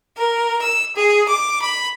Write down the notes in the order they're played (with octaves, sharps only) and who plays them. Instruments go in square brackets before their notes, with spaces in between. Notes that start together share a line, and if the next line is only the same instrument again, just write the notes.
[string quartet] A#4
E6
G#4
D6
B5